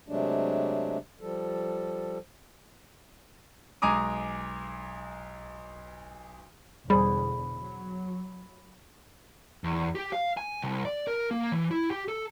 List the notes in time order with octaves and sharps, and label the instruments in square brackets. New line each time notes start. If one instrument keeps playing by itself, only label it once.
[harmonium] C3 F#3 G#3 A3 D4
F3 G3 A4
[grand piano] B1 G#3 G#5 A#5 D6 D#6
[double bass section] E2 B2 D3 [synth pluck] G3 [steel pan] G#4 C5 [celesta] B5
[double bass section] F#3
[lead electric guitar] E2
G4
F5
G#5
C2
D5
A#4
A#3
E3
E4
G4
A4